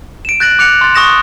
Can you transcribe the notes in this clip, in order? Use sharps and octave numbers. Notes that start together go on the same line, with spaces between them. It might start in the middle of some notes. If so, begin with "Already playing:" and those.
D7 E7
F#6 G6 A6 A#6 D7 F#7
D6 F#6 C#7 F7
C6 A6
C#6 D#6 A#6 E7